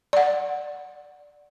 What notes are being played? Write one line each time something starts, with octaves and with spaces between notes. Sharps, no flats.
D5 F#5